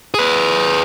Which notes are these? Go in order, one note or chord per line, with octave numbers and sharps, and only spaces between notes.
G#4 B4